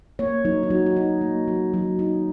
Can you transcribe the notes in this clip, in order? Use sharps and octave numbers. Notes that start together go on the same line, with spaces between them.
A#3 C#5
F#3 D#4
D#4
F#3 F#4
F#4
D#4
A#3
F#3
F#3
D#4